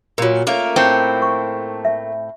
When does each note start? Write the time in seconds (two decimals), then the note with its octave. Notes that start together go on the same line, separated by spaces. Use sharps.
0.18 A#2 F#3 F4 A#4
0.47 A3 A#3 C#4 A#4 C#5
0.76 A2 C4
1.22 C#6
1.85 E5